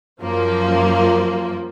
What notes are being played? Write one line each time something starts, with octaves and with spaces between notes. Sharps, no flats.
F#2 F3 A#3